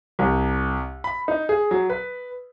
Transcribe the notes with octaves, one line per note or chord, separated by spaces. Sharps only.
C2
B5
D#4
G#4
F#3
B4